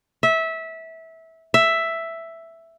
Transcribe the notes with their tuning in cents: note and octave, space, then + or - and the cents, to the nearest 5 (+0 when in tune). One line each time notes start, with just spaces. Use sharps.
E5 -20
E5 +5